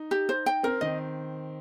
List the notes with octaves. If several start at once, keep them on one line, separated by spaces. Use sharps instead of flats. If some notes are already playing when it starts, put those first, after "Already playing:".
Already playing: D#4
G4
C5
G5
C4 A#4
D#3 D#5